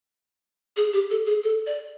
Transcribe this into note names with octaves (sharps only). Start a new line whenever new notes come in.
G#4
G4
A4
G#4
A4
D5